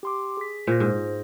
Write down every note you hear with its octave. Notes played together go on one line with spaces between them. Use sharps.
G4 C6 D6
G#4 B6
A#2 C5 A#6
G#2